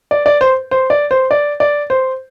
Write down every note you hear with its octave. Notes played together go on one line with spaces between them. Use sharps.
D5
D5
C5
C5
D5
C5
D5
D5
C5